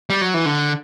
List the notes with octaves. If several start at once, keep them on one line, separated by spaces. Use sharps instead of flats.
G3
F#3
E3
D3